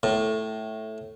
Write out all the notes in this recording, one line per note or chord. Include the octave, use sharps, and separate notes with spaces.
A2